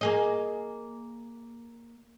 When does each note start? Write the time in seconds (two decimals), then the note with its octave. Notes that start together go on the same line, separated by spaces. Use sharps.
0.01 A#3 G#4 D#5